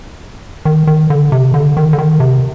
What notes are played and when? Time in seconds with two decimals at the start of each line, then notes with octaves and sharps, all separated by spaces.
0.65 D#3
0.87 D#3
1.10 D3
1.32 C3
1.54 D3
1.77 D#3
1.93 D3
1.98 D#3
2.20 C3